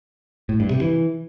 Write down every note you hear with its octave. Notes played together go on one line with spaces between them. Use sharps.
A2
G2
C3
E3